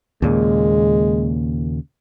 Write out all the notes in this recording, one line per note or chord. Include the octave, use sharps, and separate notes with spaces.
D#2 A#2 C#3 G#3